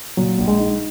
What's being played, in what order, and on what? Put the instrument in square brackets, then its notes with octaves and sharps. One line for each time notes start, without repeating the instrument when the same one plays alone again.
[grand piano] A#2 [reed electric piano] F#3
[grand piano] A#1
[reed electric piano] G#3
[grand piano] D#4